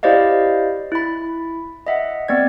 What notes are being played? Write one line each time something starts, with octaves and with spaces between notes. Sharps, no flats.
E4 G4 C5 D5 D#5 F5
E4 B5
D#5 E5 F#5
B3 C4 D5 G#6